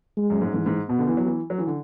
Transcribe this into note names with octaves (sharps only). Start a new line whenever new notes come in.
G#3
F#2
G#2
G#2 E3
G#2
B2 B3
D3
E3
F#3
E3
F#3
E3
D3